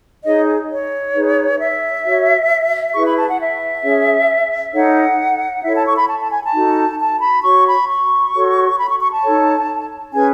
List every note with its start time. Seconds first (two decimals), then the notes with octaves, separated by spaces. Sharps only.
0.25 D#4 G#4 C#5 D#5
0.70 C#5
1.15 D#4 G#4 B4
1.60 E5
2.05 F#4 C#5
2.94 E4 G#4 B4 C#6
3.06 B5
3.17 A5
3.28 F#5
3.39 E5
3.84 C#4 G#4 C#5
4.74 D#4 A4 C#5 F#5
5.64 E4 A4 C#5 E5
5.75 A5
5.86 C#6
5.98 B5
6.08 A5
6.20 A5
6.31 G#5
6.43 A5
6.54 D#4 F#4 A4
6.99 A5
7.21 B5
7.43 F#4 C#5 C#6
7.66 B5
7.89 C#6
8.34 F#4 A4 C#5
8.79 B5
8.89 C#6
9.00 C#6
9.12 A5
9.23 D#4 A4 C#5
10.13 C#4 G#4 B4 G#5